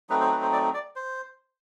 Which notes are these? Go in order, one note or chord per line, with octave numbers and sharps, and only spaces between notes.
F#3 A3 C4 D#4 B4
C5
B4
C5
D5
D5
C5